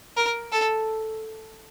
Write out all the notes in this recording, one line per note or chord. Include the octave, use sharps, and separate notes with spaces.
A#4
A4